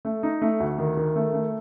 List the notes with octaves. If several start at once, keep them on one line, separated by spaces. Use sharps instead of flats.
A3
D#4
A3
D2
D#3
D#3
A3
A3